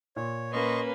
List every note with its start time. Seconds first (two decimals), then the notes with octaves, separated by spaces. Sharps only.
0.16 A#2 C#5
0.53 A#3 C#4 B4 D#5 C6 C#6